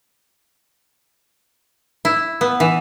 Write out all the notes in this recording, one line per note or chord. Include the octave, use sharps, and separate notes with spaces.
E4
B3
E3